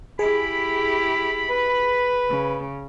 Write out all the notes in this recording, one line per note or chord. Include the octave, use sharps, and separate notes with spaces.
E4 G4 G#4 B5
B4
C#3